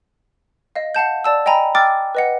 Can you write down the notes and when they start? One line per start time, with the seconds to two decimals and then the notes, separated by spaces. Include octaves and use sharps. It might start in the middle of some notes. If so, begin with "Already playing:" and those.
0.76 D#5 F5
0.95 F5 F#5 A5 G6
1.24 D5 A5 E6
1.46 D#5 G5 G#5 A#5 B5
1.75 G5 D6 E6 F6 A6
2.15 B4 D#5 F#5